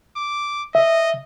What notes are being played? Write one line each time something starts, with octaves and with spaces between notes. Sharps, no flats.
D6
D#5 E5